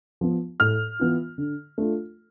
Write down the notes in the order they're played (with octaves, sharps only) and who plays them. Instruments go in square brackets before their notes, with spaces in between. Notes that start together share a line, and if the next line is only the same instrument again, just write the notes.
[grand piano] F3 B3
A2 F6
E3 B3 F4
D3
A3 D4 F4